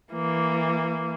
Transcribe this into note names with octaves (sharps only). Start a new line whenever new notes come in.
E3 A#3